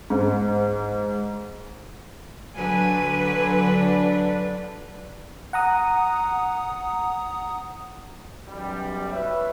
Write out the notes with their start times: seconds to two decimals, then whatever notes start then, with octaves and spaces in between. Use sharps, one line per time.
0.10 G#2
2.56 D3 F#3 B4 G#5
3.63 D4
5.53 F#5 A#5 D#6
8.49 B1 F#2 G3
9.12 B4 C#5 E5